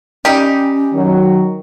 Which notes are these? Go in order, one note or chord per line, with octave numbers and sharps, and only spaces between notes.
G3 C#4 D#4 G4
D#3 F#3